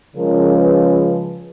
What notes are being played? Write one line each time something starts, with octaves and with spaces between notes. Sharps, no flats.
C#3 F3 G#3 C#4 A#4
B4